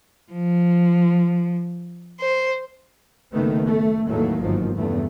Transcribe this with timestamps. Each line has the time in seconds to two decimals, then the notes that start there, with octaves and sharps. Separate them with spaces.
0.33 F3
2.19 C5
3.32 F#1 D#3 A3 B3
3.67 A3
4.08 E2 A2 D#3 F#3 A3 A#3
4.42 G1 G#2 D#3 F3 F#3
4.75 E2 G2 C#3 A3